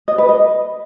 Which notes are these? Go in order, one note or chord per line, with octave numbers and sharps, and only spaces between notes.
D#5
B4
D#5